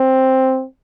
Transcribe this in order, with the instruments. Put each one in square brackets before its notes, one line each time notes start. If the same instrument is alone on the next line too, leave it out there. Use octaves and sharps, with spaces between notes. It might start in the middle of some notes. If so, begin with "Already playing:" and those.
Already playing: [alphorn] C4